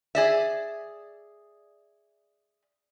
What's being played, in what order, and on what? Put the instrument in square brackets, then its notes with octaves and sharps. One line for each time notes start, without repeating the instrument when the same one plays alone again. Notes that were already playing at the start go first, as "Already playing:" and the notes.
[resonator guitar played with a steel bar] G#4 D5 E5